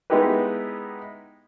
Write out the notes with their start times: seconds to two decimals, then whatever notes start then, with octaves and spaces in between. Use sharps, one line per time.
0.10 G#3 B3 D#4 E4 G4 B4